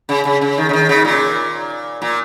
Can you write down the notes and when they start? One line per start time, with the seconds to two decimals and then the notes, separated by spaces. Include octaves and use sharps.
0.09 C#3
0.25 C#3
0.41 C#3
0.58 D#3
0.69 C#3
0.73 D#3
0.89 C#3
1.05 A#2
2.02 A#2